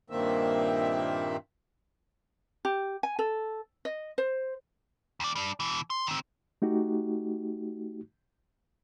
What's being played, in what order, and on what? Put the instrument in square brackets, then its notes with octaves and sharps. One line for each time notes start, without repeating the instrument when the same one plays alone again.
[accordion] G2 A#2 D#3 A#3 C4 E5
[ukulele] G4
G#5
A4
D#5
C5
[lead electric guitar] D#2 D5
G3 D4
B2 E3
C6
D#3 C4
[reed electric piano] A3 D#4 F#4 G4